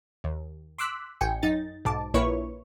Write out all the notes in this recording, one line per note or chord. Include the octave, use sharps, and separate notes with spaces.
D#2
C6 D6 E6 F#6 B6
A1 G5 G#5 C#7
F#2 D#4 A6
B1 G#2 A5 D6
A#1 A#3 E4 B4 C#5 C#6